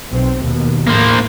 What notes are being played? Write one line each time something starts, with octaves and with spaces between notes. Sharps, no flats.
B1 C4
D#2 B2
A2 A#3 C5